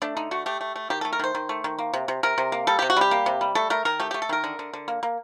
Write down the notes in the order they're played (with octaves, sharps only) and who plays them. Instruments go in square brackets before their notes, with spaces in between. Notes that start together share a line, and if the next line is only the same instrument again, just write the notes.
[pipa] A3 D4
D3 D#4
A3 F#4
A3 G4
A3
A3
D#3 G4
A3 A4
A#4
D#3 C5
D#3
A3
D#3
A#3
C3
C3
C3 A#4
C3
A#3
G3 A4
C3 G4
F#4
G3 G4
A#3
C3
G3
A3 A4
A3 A#4
D#3 A#4
A3 G4
A3 G4
A4
D#3 A#4
D3
D3
D3
A#3
A#3